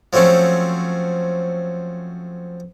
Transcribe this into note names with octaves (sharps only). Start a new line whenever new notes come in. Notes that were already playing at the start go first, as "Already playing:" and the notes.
F3 F#3 A3 C4 C#4